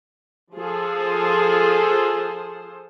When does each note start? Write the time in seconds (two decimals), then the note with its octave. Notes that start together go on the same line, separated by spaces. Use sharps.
0.55 F3 F4 G#4 A4 C5